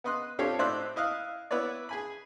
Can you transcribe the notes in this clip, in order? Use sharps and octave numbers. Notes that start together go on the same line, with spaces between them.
B3 B4 D#5 C6 F#6
C4 D4 F4 G4 A4 C#5
A2 D#4 C5 D5 E5 F#6
E4 D#5 F5 F#6
B3 E4 B4 C#5 D5
G#4 G#5 B5